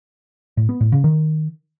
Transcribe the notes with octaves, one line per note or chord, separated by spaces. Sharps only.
A2
B3
A2
C#3
D#3